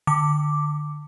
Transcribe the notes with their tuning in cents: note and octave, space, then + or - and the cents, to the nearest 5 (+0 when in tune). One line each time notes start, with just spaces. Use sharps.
D3 +25 D6 +0